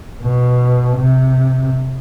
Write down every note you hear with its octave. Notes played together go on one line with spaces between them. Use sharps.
B2
C3